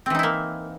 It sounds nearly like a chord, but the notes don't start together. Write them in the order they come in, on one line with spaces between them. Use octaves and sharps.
C4 E3 D#4 E4 A#3